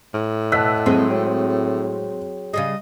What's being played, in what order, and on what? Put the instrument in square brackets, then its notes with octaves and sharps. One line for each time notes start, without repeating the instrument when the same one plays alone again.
[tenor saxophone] A2
[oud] B2 [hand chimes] D#5 F#5 A5 [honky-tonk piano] E6 F#6 B6
[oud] F#3 G#3 G#4 [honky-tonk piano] C4
[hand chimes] F#4 C#5 G5
[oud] C#3 G3 G#4 [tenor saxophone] D#5